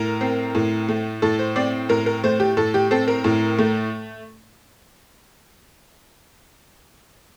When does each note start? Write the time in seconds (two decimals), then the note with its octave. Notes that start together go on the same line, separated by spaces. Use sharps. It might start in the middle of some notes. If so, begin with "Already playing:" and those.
Already playing: A2 A#4
0.21 C4
0.55 A2
0.88 A3
1.22 A2 A4
1.39 C5
1.56 C4 D5
1.89 A2 A#4
2.06 A#4
2.24 A3 C5
2.40 G4
2.57 A2 A4
2.74 G4
2.91 C4 A4
3.08 A#4
3.24 A2
3.59 A3